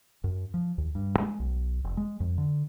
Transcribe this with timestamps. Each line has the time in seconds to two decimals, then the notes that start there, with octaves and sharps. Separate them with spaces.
0.24 F#2
0.54 F3
0.78 D#2
0.95 G2
1.19 G#3
1.40 B1
1.84 F1
1.97 G#3
2.20 F2
2.38 D3